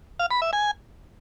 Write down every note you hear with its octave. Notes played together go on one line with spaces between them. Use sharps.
F5
B5
E5
G#5